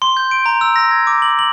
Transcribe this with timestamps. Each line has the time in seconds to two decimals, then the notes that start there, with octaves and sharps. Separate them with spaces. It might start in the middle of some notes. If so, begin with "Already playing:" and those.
0.02 C6
0.17 G6
0.31 D7
0.46 A#5
0.61 E6
0.76 A#6
0.91 G#6
1.07 D6
1.22 F#7
1.39 F#7